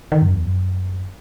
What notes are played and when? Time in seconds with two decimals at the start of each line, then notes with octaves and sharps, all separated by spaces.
0.12 D#3
0.22 F#2
0.34 E2
0.45 F#2